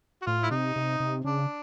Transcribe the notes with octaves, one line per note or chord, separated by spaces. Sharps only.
F#4
A2 F4
E4
C3 D#4
C3
C3
C#3 D4